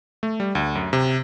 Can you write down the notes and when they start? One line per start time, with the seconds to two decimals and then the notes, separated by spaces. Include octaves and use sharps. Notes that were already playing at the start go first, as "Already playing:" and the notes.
0.23 A3
0.40 G3
0.55 D2
0.75 F#2
0.93 C3